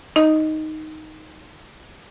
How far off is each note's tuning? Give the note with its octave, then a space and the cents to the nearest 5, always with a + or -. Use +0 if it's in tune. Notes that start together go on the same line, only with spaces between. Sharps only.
D#4 +0 D#5 +0